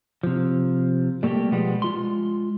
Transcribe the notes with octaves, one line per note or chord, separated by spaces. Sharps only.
C3 F3
G3 A3 A#3 F#4 G4
B2 F3 G3 G#3 B3
G#3 F4 C6